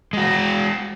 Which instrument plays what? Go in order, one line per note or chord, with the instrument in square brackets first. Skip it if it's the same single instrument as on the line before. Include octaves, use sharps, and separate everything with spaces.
[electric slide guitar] G#3 F#4